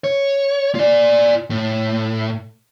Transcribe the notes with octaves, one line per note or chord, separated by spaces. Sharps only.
C#5
F4 D5
A2